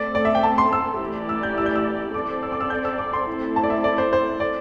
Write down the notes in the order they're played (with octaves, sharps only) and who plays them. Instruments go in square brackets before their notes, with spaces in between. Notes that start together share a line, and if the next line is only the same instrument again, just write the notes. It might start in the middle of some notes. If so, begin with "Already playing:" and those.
Already playing: [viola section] A3 C4 A4 [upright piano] D5
[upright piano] D5
E5
G5
A5
C6
E6
[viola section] E3 A3 E4 G4 D5
[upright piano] E6
G6
E6
G6
E6
[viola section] C4 A4 D5 [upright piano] D6
[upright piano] E6
D6
E6
G6
E6
D6
C6
[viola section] A3 C4 E4 A4
[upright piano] A5
D5
E5
D5
C5
C5
D5